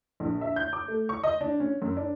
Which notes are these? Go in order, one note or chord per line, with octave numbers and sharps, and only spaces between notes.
A#1
E5
G6
D6
A3
C#6
D#5
D4
C#4
F#2
D4